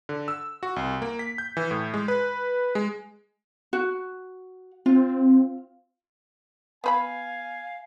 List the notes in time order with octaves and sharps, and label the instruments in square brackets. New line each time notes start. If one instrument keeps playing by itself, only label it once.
[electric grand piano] D3
E6
F#4
C2
A#3
B6
G6
E3
A2
G#3
B4
G#3
[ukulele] F#4
[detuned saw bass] C4 [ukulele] F4
[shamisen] B3 B4 B5 [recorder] F5 [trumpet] G#5